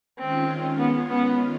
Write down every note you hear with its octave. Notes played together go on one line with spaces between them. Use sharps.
D#3 G#3 C4 C#4 F4
B3
B3